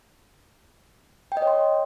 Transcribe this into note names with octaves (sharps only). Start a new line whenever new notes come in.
G5
D#5
C#5
C6